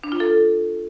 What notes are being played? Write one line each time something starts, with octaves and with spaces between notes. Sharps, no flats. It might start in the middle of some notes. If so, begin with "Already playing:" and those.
D4
F4
A4